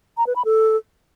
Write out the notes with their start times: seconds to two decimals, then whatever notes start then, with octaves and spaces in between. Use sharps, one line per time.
0.17 A#5
0.27 B4
0.36 B5
0.45 A4